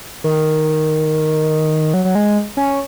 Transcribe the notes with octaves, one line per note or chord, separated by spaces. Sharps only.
D#3
F#3
F#3
G#3
C#4